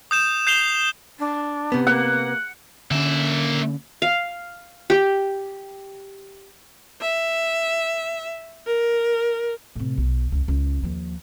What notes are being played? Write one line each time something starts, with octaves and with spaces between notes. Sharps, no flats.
D#6 G6 E7
G6 C7 E7 F7 G7
D4
C3 B3
A#3 F#5
D3 A#3 C4 C#4 E5
F5
G4
E5
A#4
A2 C3
B1
C#2
C#2
D#2 F3